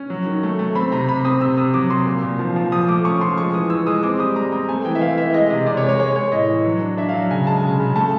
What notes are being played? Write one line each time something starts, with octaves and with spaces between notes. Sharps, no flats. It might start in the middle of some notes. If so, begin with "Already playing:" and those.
Already playing: C#4
F#3
D#3
A3
A3
C4 B5
C3 A#5
C3 B5
C4 D#6
C3 E6
C3 D#6
F#3 D6
C3 C6
A#2
A#2
F3
F3
F3 D#6
A3 D6
C#4 C#6
F3 C6
G#3 C#6
E3 D#6
E3 E6
G#3 D#6
C4 D6
G3 D#6
G3 A#5
C4 A#5
A3 G#5
E3 G5
E5
E3 F5
E3 E5
G#3 D#5
C3
C3 D5
C#5
G#3
C#5
G#3 C#5
G#3 C#5
A2 D#5
E3
F#3
D4
D4 E5
F5
F#3
C#3 G#5
G#3 A5
C#3
C#3
A3 A5